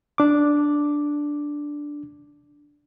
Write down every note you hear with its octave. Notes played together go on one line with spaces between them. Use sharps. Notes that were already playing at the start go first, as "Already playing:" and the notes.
D4 D6